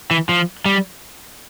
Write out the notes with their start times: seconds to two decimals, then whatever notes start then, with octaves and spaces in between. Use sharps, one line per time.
0.11 E3
0.29 F3
0.65 G3